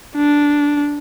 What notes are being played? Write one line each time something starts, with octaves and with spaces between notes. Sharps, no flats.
D4